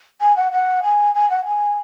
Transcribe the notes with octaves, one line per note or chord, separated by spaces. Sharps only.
G#5
F#5
F#5
G#5
G#5
F#5
G#5